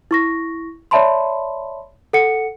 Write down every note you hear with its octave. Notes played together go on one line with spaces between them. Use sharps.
E4 C#6 A#6
C#5 D5 E5 A5 B5 C6
A4 F#5 C#7